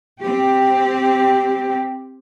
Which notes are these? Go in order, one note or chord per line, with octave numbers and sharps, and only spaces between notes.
C4 G4